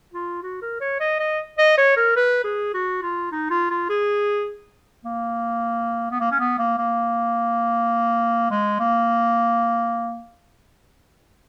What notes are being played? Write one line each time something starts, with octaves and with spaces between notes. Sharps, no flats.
F4
F#4
A#4
C#5
D#5
D#5
D#5
C#5
A#4
B4
G#4
F#4
F4
D#4
F4
F4
G#4
A#3
B3
A#3
C#4
B3
A#3
A#3
G#3
A#3